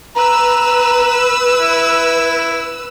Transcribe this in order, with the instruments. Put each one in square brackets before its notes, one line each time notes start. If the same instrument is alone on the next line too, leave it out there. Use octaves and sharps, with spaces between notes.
[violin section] B4 E6 [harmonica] A#5
[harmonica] E4